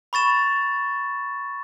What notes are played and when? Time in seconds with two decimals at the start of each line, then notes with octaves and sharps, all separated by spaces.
0.13 B5 C#6 A6 E7